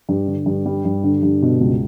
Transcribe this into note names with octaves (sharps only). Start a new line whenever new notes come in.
G2
D3
G2
G3
G2
D3
G2
B2
C#2